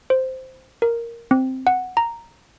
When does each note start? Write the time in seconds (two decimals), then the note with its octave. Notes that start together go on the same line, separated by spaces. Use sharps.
0.10 C5
0.82 A#4
1.31 C4
1.67 F#5
1.97 A#5